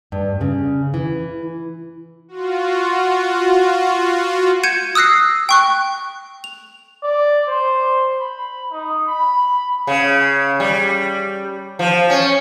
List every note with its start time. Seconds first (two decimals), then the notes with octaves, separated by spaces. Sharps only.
0.12 G2
0.41 C#3
0.94 E3
2.28 F4 F#4
4.63 G6 G#6 C#7 D#7 E7
4.95 D#6 E6 F#6 A#6 C7
5.49 G5 C#6 F#6
6.44 F7
7.03 D5
7.48 C5
8.20 B5
8.72 D#4
9.09 B5
9.87 C#3
10.60 G3
11.79 F3
12.10 C#4